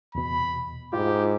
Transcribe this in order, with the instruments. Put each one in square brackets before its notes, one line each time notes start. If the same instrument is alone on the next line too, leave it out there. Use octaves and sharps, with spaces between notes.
[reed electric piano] E2 B2 [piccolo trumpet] B5
[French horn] G#2 [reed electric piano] E4 F4 [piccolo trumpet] G4